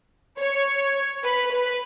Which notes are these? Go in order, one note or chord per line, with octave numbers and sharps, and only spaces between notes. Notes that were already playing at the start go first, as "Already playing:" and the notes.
C#5
B4
B4